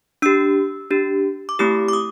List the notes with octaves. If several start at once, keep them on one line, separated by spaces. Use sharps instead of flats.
D4 G4 E6
D4 G4
D6
A3 C4 E4 G4 D#6
D6
D#6